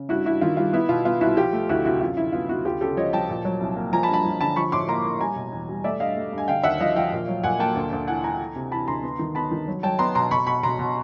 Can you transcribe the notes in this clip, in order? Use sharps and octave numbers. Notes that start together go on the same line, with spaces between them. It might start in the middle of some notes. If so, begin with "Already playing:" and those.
Already playing: C#3
G2 E4 F#4
G2 E4 F#4
D#3 F4
G3 F4
B3 E4
B2 F4
B3 F4
C2 E4 F#4
F3 F4 G4
A3
D2 E4 F#4
C3 E4 F#4
F#2 F4
D3 E4
B3 F4
B3 E4 F#4
D2 F4 G4
C#3 G4 A4
F3 C#5 D#5
F3 G5 A5
A#2
F#3
C2
A#3
F3 G#5 A#5
A5 B5
G2
A5 B5
F3
D3 A5 B5
F3 B5 C#6
A2 C6 D6
A#3 A#5 C6
A#3
G3 G#5 A#5
B2
E2
G3
A3 D5 E5
G2 D#5 F5
A3
G2 G#5
D3 F5 G5
D#2 E5 F#5
F3 D#5 F5
F3 F5 G5
A#2
F#3
A#2 F#5 G#5
A#3 G5 A5
D2
D2
E3 F#5 G#5
E3 G#5 A#5
E3
C3
E3 A5 B5
D2 A#5 C6
B3
D#3
B3 A5 B5
D#3
F#3
F#3 G5 A5
B3 A#5 C6
B2 A#5 C6
B2 B5 C#6
B2 B5 C#6
B2 A#5 C6
B2